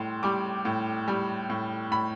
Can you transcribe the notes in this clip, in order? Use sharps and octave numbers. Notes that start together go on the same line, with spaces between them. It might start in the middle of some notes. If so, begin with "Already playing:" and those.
Already playing: A2 G3 C6
G3 D6
A2
G3
A2
A2 B5